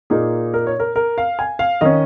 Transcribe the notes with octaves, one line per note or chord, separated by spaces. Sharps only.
A#2 A#3 D#4 G#4
A#4
C#5
A#4
A#4
F5
G#5
F5
D#3 C#4 D#5